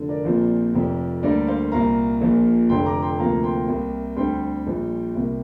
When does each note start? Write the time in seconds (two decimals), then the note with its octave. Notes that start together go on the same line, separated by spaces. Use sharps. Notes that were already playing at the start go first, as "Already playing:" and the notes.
Already playing: F1 D3
0.09 A#4 D5
0.24 A#1 A#2 F3 C4
0.74 F1 F2 C3 F3
1.23 D2 D3 G3 A#3 A#4 D5
1.47 C5 F5
1.72 C2 A#2 A#3 F5 A#5
2.21 A#1 A#2 F3 A#3
2.69 F1 F2 D3 G5 C6
2.86 A#5 D6
3.02 G5 C6
3.19 D2 C3 F3 A#3 F5 A#5
3.43 G5 C6
3.68 C2 C3 A#3
4.17 D2 D3 G3 C4 G5 C6
4.67 A#1 A#2 G3
5.15 C2 C3 A#3